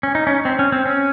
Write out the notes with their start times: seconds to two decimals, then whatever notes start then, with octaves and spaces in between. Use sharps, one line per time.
0.03 C#4
0.15 D#4
0.27 C#4
0.45 C4
0.59 C#4
0.72 C4
0.86 C#4